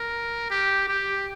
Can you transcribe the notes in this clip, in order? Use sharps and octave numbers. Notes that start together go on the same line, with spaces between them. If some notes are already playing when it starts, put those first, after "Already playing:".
Already playing: A#4
G4
G4